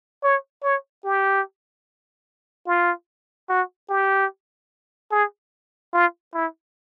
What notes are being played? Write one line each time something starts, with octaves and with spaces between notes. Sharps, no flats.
C#5
C#5
G4
F4
F#4
G4
G#4
F4
E4